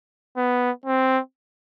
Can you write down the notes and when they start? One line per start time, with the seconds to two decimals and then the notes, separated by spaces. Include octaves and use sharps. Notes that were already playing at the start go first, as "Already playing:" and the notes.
0.37 B3
0.86 C4